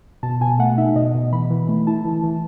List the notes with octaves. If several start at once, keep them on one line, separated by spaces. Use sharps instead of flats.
B2 A5
B2 G#5
A3 F#5
D#4 E5
B2 D#5
B2
E3 B5
E3
A3
E4 A5
E3
E3